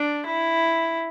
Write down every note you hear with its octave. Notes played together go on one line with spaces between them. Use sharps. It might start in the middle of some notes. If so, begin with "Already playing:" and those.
Already playing: D4
E4